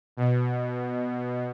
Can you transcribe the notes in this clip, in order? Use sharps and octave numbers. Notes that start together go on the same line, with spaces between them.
B2